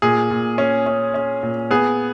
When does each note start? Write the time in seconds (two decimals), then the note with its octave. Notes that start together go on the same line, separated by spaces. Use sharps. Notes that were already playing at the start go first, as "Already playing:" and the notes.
0.02 A#2 G#4
0.30 A#2
0.58 C#4
0.86 C#4
1.14 C#4
1.43 A#2
1.71 B3 G#4